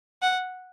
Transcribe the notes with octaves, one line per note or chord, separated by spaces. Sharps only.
F#5